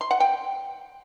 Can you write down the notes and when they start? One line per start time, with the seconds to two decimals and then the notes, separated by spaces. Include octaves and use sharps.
0.01 C6
0.11 F#5
0.20 G5